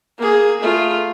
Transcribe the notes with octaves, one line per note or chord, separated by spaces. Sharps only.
A#3 G#4
A3 F4